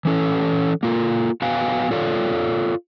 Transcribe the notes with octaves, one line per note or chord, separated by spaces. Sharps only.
E3 C#4 A4 C#5
A#3 F4 A4
B3 F#4 B4 F5 G5 G#5
F4 A4 C#5 D5 F5